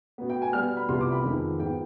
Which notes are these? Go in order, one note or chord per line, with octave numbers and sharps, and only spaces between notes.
B2 B3
G5
G#5
B2 G3 B3 F6
B5
C2 C3 F3 B3 C6
D6
B5
F2 D#3 G#3 B3
G#2 F3 B3 G5